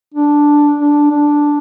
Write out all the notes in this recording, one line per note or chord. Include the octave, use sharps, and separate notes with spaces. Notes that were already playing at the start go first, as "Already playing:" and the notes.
D4
D4
D4